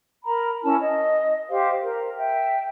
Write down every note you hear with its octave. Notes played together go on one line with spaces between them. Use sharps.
A#4 A#5 B5
C#4 E4 A#4 A5
D#5
G4 C5 F5
A#4
E5 G5